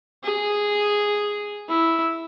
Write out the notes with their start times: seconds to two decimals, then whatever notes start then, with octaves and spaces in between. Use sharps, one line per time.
0.24 G#4
1.69 E4